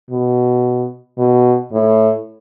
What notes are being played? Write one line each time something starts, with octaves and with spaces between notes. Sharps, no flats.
B2
B2
A2